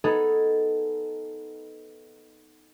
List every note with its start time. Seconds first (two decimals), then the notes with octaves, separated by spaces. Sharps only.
0.04 B3 D#4 G#4 A4